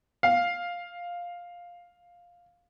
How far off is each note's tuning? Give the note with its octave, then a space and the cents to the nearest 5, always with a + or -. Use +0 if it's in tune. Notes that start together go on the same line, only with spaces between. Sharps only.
F5 +5